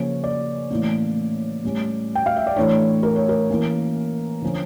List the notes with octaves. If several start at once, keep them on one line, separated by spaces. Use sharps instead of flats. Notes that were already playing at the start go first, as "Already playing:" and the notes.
Already playing: C#3 F3 A#3 C#4 C#5
D5
A2 E3 A#3 C#4
A2 G3 C#4
G5
F5
E5
D5
A2 E3 A3 D4 C#5
A#4
C#5
A#4
E3 A#3 C#4
D3 F3 C#4